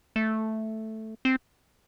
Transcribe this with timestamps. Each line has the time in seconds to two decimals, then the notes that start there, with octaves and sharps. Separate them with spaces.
0.16 A3
1.25 C4